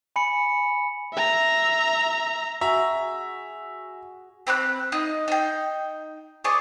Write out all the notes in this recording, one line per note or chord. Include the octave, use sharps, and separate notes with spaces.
G#5 B5 C#7
E5 A#5
F#4 G#4 E5 A#5
C4 B5 D6 F#6
D#4 D#5
D#4 G5
G#4 D5 D#5 C#6